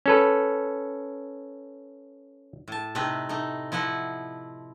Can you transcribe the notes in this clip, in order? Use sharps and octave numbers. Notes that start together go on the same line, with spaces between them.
C#4 A4 B4
A2 A5
C3 A3 C4 D#4 B4
A3 D#4
F3 E4 D#5 F#5